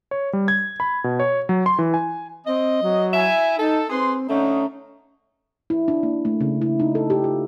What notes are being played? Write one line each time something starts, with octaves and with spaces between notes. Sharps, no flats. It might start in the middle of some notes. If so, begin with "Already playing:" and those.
C#5
G3
G#6
B5
B2
C#5
F#3
C6
E3
G#5
C4 D#5
F#3
E4 E5 G#5
D#4 A4
C4 G#4 B4 C6
D3 A3 C#4 D#4
E4
D4
A#3
A3
C#3
E4
D#4
A4
G4
F4